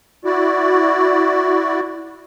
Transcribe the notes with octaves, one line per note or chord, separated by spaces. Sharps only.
E4 F#4 D5